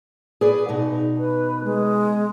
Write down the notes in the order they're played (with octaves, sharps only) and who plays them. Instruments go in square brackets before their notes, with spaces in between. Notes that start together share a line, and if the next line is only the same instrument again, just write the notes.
[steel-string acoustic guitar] G#4 B4 D5
B2 D#4
[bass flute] B4
G#3